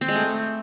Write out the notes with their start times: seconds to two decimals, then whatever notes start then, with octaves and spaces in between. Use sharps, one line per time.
0.01 C4
0.08 G#3
0.15 A3